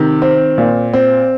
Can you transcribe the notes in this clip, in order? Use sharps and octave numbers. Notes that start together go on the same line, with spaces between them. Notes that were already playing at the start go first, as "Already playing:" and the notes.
Already playing: C3 D#3
C4
A#2
C4